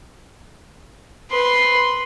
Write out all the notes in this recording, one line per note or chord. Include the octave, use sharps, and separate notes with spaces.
B4 C6